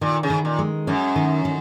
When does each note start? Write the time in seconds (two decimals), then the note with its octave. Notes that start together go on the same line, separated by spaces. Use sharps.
0.01 A#2 D#3
0.23 C#3
0.30 D#3
0.45 A#2
0.59 G#3
0.87 F#2 C#4
1.16 D#3
1.45 D#3